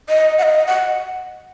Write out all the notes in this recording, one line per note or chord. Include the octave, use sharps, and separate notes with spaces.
D#5
F#5
D#5
F#5